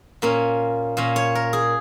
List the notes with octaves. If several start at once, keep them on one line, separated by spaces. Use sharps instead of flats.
A#2 A#3 C#4
A#2 A#3 C#4
C#5
A#4
G#4